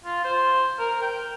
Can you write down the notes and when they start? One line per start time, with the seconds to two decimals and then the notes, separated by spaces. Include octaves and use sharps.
0.04 F4
0.25 C5
0.79 A#4
1.02 G5